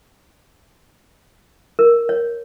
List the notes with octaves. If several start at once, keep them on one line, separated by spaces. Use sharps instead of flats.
A#4
C#5